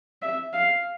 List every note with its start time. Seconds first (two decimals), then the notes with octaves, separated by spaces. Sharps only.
0.22 E5
0.53 F5